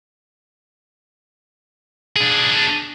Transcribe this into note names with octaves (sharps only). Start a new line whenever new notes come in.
D4 G#4